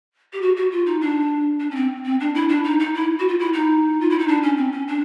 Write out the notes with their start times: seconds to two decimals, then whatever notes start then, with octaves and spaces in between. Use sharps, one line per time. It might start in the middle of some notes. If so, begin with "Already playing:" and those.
0.33 G4
0.42 F#4
0.57 F#4
0.72 F4
0.86 D#4
1.01 D4
1.60 D4
1.71 C#4
1.75 C4
2.05 C4
2.20 D4
2.35 E4
2.49 D4
2.64 D#4
2.80 D#4
2.94 E4
3.19 F#4
3.29 F4
3.39 E4
3.53 D#4
4.01 F4
4.10 E4
4.19 D#4
4.28 D4
4.43 C#4
4.57 C4
4.72 C#4
4.88 D4